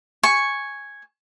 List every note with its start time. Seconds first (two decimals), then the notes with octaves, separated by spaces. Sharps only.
0.23 G#5 C#6